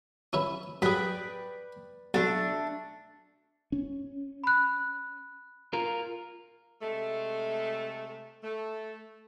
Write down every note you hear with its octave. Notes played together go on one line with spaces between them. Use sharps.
C#4 E4 B4
F#2 G#4 B4 D5 G5
B1 A3 D4
C#4
B5 F#6
F4 A#4
C3 G#3 A3
A3